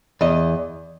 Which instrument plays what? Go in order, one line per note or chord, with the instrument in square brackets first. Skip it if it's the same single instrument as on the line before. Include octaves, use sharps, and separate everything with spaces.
[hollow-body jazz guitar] E2 D#5